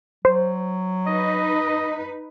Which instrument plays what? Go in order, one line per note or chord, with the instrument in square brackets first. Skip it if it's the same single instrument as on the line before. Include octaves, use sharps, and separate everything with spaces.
[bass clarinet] F#3 [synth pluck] C5
[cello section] D#4 B4 [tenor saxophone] D#5